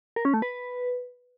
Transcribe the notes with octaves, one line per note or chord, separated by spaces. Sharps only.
A#4
C#4
A3
B4